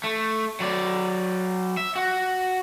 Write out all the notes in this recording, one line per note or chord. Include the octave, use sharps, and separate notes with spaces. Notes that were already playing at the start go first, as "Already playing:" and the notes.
A3
F#3 D5
E5
F#4